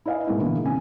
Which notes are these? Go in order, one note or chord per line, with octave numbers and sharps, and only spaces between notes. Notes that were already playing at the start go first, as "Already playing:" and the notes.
E4 B4 D#5 F5 G#5
B1 A2 G#3 A#3 E4
B2 D3 E3
D#1 C2 F#2 G#5